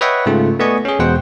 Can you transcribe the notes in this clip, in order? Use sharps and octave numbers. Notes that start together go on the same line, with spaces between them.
B4 C#5 D#5 E5 F#5 G5
G#2 C#3 A3 F4
A3 B3 D5 D#5 G#5 C#6
C#4 G#4
E2 B2 G#3 C5 F#5 G5